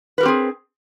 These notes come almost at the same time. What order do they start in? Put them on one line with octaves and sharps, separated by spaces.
B4 A#4 G4 C4 G#4